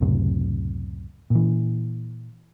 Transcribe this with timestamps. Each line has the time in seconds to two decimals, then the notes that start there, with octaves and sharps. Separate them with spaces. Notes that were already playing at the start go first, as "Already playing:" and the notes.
0.01 C#2 F#2 A2 C3
1.30 A#2 E3